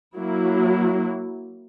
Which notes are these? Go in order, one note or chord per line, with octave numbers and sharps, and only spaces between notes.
F#3 A#3 E4